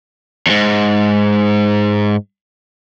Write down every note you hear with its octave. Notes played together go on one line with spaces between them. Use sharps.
E2 G#2